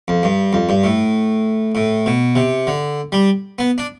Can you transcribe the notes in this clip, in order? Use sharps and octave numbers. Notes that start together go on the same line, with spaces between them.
F2
G2
F2
G2
A2
A2
B2
C3
D3
G3
B3
D4